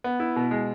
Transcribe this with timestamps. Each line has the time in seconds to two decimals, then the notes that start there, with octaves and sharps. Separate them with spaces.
0.04 B3
0.20 E4
0.36 B2
0.51 G#3